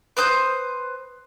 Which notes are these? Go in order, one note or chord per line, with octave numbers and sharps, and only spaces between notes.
B4 C5 D#6 G6